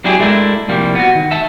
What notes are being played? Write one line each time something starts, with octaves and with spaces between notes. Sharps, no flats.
F#3 D4 E4 G4 G#4
G#3 A3 B3 D4 E4 A#4
C2 F3 G3 A#3
B3 F#4
D#3
E5 A5